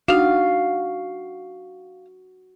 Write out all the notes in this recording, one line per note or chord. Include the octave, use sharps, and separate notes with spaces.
D4 D#4 F#4 F5